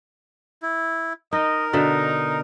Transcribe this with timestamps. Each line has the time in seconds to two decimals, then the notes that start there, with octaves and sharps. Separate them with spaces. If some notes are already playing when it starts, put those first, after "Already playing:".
0.62 E4
1.33 D#4 A#4 D#5
1.73 B2 D3 D#4 E5